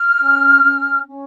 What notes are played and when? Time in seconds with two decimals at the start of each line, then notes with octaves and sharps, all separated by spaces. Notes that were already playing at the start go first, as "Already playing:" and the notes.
Already playing: F6
0.19 C#4
0.63 C#4
1.08 C#4